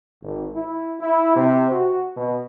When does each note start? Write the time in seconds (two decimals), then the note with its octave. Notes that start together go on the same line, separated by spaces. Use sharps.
0.23 G#1
0.56 E4
1.00 E4
1.36 C3
1.71 F#4
2.17 B2